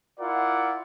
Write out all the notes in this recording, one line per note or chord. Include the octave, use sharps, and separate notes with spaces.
E4 F4 A#4 D5 F#5